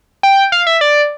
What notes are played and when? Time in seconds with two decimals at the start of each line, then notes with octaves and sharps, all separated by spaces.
0.23 G5
0.52 F5
0.67 E5
0.81 D5